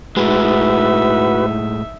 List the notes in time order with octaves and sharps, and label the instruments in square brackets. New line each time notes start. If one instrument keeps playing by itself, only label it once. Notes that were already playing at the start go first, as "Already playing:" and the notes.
[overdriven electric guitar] A2 G#3 [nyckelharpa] D#4 E5 [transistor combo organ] F#4 B4